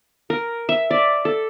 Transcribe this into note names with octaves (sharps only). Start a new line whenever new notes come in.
A#4
E5
D5
A4